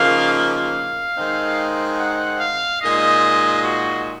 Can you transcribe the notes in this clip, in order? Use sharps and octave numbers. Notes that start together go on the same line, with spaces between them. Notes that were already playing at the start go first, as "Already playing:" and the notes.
Already playing: C#3 F3 A#3 D#4 F5
F5
D#3 G#3 C4 D#4
F#5
F5
A#2 G#3 D#4 D#5
F#4